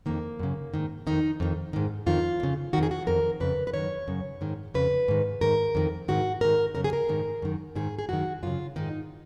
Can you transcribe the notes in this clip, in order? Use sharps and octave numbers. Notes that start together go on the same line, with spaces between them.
F2 D#3 A#3
F#2 C#3
G#2 D#3
F2 D#3 D#4
F2 D#3
G#2 D#3
F2 D#3 F4
F2 C#3
F2 D#3 F#4
G#4
F#4
F2 D#3 A#4
F2 C#3 B4
B4
F#2 D#3 C#5
F#2 C#3
G#2 D#3
F2 C#3 B4
G#2 D#3
G#2 D#3 A#4
F2 D#3
G#2 D#3 F#4
G#2 D#3 A#4
F#2 C#3 A#4
G#4
A#4
G#2 D#3
F#2 D#3
G#2 D#3 G#4
G#4
F#2 D#3 F#4
F#2 C#3 F4
G#2 D#3 D#4